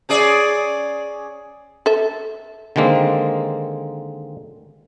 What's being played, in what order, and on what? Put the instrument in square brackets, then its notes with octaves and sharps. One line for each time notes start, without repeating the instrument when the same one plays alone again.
[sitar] C#4 G#4 D5
[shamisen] A4 E5
[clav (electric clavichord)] D3 D#3 G#3 A#3 C4